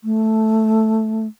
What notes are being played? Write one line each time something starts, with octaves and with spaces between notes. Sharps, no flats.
A3